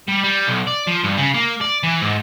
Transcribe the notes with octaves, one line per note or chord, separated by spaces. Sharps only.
G3
G3
B1
D5
F3
G2
C#3
A#3
D5
E3
G#2